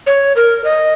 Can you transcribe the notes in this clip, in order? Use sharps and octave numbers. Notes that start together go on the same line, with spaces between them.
C#5
A#4
D#5